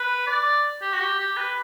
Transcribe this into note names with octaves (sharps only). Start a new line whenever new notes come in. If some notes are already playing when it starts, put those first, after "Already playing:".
Already playing: B4
D5
G4
F#4
G4
G4
B4